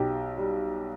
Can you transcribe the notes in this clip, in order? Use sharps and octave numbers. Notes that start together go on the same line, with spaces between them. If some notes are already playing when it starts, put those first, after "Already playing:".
Already playing: B1 G4
G3